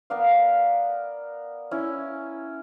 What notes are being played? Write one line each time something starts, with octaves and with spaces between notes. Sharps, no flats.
B3 A#4 D5 F5
C#4 E4